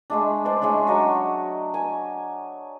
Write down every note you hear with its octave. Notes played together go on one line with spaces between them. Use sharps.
G#3 A3 D4
D4 C5 D5
G#3 A3 C#4 D4
F#3 D4 D#5 C#6
G#5